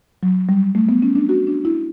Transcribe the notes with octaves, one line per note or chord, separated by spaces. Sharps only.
F#3
G3
A3
B3
C#4
D4
F#4
D4
E4